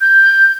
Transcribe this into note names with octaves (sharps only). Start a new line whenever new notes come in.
G6